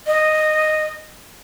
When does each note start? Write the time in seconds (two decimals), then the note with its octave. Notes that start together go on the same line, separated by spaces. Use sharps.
0.07 D#5